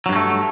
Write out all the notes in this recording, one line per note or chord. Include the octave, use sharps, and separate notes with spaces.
G2 F#3 G#3 A3